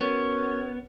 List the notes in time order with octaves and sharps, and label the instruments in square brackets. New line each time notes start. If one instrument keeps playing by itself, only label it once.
[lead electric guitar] B3 [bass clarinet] C#4 [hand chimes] F#4 A#4 [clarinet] C#5